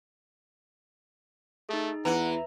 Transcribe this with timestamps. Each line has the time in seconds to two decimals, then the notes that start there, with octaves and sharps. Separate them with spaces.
1.69 A3 D#4 G#4
2.05 E2 E3 F#5 A#5